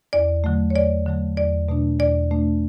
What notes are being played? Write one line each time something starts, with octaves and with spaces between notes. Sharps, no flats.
E2 D5
D3 F#3 A3
C#5
E2 D5
D3 F#3 A3
E2 D5
B2 A3 D4
E2 D5
B2 A3 D4